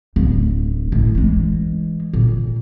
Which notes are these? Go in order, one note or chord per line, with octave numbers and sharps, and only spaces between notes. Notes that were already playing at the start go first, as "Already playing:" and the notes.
D1
A1
E3 G#3
A#2